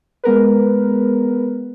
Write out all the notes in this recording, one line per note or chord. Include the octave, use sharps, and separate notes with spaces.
G#3 B3 A#4 B4